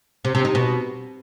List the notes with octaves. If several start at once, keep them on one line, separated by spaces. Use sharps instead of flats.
C3
C3
D#4
B2